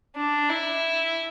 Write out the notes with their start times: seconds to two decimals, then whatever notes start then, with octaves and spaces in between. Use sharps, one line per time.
0.16 D4
0.49 E4